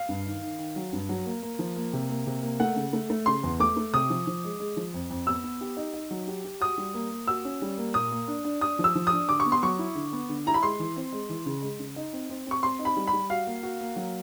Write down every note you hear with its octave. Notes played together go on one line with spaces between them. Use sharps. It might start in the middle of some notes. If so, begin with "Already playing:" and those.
Already playing: F5
G2
D#3
D#3
D#3
F#3
G2
F#3
A#3
A#3
F3
A#3
C3
A#3
C3
A#3
A3 F#5
C#3
A3
A3
C#3 C6
E2
A3 D6
A3
C3 D#6
F3
F3
G#3
G#3
F3
F2
F2
B3 E6
B3
G4
D#4
D#4
F#3
G4
G4
F#4 D#6
G3
A#3
A#3
F#4 E6
C#4
G3
A#3
A#2 D#6
A#3
D4
D4
D4 D#6
F3
E6
F3
D#6
D4
D3 D6
C#6
B3
C6
F#3 C#6
E4
D3
B3
D3
E4 A#5
B5
G#3 C6
E3
C4
G#3
E3
C#3
G#3
C#3
D#4
C4
C4
C4 C#6
C4 C6
D#4
B5
G3
B5
G3
F#4 F5
A#3
F#4
A#3
F#3